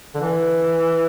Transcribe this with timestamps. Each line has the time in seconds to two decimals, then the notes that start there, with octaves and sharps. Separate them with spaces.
0.15 D3
0.20 E3